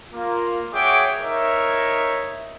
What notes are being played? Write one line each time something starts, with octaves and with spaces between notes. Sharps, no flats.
A#3 F4
F#4 G#4 C#5 E5 G5 D6
D#4 A#4 C#5 E5